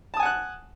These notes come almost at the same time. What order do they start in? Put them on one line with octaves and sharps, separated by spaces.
A5 D#6 G#5 F#5 F#6